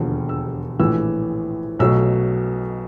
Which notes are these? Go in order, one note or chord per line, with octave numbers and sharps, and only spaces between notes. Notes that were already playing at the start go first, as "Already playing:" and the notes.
Already playing: E1 D#2 D3 F3
E6
A#1 A2 E3 E6
B1 B2 F#3 A3 E6